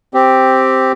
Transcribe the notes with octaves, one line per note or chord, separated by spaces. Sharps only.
C4 G4